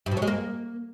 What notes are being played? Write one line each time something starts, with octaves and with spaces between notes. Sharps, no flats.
G2
B2
F#3
G#3
A#3